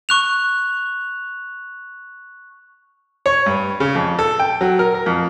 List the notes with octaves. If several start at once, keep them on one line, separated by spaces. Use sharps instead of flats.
C#6 F#6 F7
C#5
G2
C#3
F2
A4
G5
F#3
A#4
A#4
F2